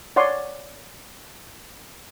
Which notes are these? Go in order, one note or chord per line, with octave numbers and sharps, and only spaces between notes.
C#5 D5 F#5 C6